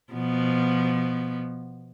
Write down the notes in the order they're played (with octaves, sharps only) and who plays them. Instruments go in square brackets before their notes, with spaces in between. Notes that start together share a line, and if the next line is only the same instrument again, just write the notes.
[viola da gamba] B2 F3 B3